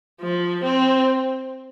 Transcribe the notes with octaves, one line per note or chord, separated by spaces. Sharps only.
F3
C4